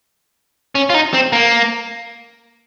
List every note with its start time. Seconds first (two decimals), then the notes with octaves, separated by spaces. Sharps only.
0.75 C#4
0.90 F4
0.94 D#4
1.14 C4
1.32 A#3